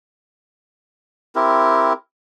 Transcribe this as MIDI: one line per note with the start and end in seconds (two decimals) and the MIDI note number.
1.35 1.93 60
1.35 1.93 64
1.35 1.93 67
1.35 1.93 70